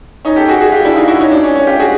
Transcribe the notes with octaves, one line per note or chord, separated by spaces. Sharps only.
C#4 D#4
G4 A4
F#4 G#4
F#4 G#4
F4 G4
D4 E4
D#4 F4
E4 F#4
C#4 D#4
D4
C#4
C#4
F4 G4
F#4 G#4